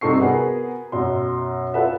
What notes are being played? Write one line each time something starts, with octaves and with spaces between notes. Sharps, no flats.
G2 C3 D#4 A4 C#6 C7
B3 F#4 G#4 A#4
F#2 B2 C6
F4 A4 B4 E5 F#5